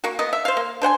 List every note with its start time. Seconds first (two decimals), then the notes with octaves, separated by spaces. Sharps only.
0.04 A#3 F#4
0.19 A#3 B3 D#5
0.33 E5
0.45 C5 F5
0.57 A#3
0.82 D4 C5 F#5 G#5